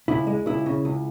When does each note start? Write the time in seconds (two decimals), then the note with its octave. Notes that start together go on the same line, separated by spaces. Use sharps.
0.08 C#2 E4
0.27 G#3
0.46 C#2 E4
0.66 C#3
0.85 C#2